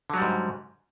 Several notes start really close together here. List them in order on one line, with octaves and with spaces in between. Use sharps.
D3 F#3 G3 G#2